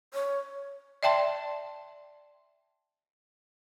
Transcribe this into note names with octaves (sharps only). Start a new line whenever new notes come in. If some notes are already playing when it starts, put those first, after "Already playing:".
C#5
D5 E5 G5 A5 C6